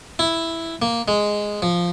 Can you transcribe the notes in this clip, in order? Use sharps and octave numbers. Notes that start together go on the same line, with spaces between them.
E4
A#3
G#3
F3